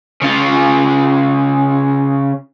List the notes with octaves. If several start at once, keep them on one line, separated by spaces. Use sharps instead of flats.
C#3 F4